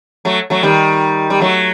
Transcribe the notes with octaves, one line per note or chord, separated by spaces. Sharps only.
F#3 A3
F#3 A3
D#3 G3
G3
F#3 A3